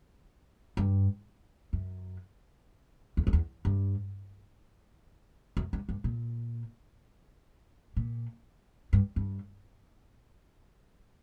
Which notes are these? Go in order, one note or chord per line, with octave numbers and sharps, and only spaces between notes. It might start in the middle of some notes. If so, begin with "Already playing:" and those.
G2
F#2
E2
F#2
E2
G2
F#2
G2
G2
A#2
A#2
G2
G2